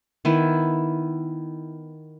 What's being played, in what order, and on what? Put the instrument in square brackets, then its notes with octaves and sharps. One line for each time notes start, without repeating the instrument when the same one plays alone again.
[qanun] D#3 B3 E4